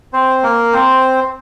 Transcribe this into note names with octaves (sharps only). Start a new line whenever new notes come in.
C4 C5
A#3 A#4
C4 C5